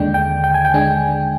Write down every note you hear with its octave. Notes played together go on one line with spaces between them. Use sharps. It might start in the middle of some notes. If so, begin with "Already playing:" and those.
Already playing: D#2 D3 G#3 D4 G5
G5
G5
G#5
G5
D3 G#3 D4 G#5